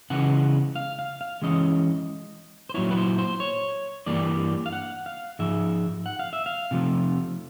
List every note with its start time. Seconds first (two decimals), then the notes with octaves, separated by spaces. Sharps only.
0.10 C#3 E3 G#3 B3 F#5
0.76 F5
0.99 F5
1.21 F5
1.42 E3 G#3 C#4 D#5
2.69 C5
2.74 A#2 F#3 B3 E4 C#5
2.91 B4
2.97 C5
3.18 C5
3.40 C#5
4.06 G2 E3 G3 A#3 D5
4.66 F5
4.72 F#5
5.06 F5
5.39 G#2 F3 G#3 E5
6.06 F#5
6.19 F5
6.33 E5
6.46 F5
6.71 C3 F3 A3